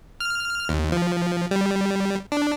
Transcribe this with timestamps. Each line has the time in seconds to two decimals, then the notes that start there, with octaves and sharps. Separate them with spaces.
0.20 F6
0.69 D#2
0.92 F3
1.51 G3
2.32 D4